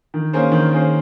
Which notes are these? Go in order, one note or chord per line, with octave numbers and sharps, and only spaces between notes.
D#3
A#3 C#4 G#4 C5
D#3
A#3 C#4 G#4 C5